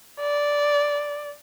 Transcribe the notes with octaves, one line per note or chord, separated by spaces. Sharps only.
D5